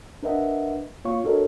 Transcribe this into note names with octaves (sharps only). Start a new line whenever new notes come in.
D4 A#4 B4 D#5 E5 F#5
A#3 F4 C#5 F5 C#6
D4 F#4 A4 A#4 C#5 D#5